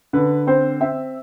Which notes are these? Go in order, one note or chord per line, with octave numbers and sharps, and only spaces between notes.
D3 B4
C4 C5
C4 E5